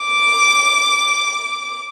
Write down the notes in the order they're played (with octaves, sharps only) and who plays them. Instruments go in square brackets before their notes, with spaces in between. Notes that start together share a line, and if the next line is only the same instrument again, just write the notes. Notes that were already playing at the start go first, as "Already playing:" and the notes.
Already playing: [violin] D6